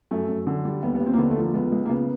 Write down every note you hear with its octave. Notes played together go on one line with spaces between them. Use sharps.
F#2 A3
F#2
D3
G3
D#2 B3
B3
D#2
C4
A#3
D3 B3
A3
F3
A#3
C#2 B3
C#2
A#3
C#3 B3